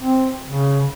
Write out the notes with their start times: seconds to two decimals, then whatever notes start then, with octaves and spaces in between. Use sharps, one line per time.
0.01 C4
0.47 C#3